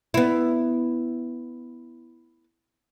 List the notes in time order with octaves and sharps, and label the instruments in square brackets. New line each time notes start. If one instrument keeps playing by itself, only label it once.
[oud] B3 E4